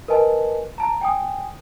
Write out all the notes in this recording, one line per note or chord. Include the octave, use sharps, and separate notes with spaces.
A#4 B4 D#5 G#5 A5
A5 A#5
G5 G#5 D#6